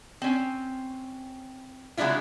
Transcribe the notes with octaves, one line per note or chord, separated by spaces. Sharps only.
C4 C#4
C#3 F#3 G#3 D4 E4 F4